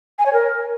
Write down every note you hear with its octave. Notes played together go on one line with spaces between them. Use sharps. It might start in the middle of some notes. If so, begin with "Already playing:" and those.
G#5
C#5
A#4